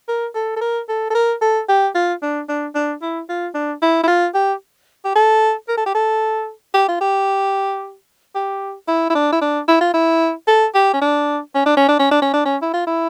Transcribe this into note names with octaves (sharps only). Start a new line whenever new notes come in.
A#4
A4
A4
A#4
A4
A4
A#4
A4
G4
F4
D4
D4
D4
E4
F4
D4
E4
E4
F4
G4
G4
A4
A#4
A4
G4
A4
G4
F4
G4
G4
E4
E4
D4
E4
D4
E4
F4
E4
A4
G4
C#4
D4
C#4
D4
C#4
D4
C#4
D4
C#4
D4
C#4
E4
F4
E4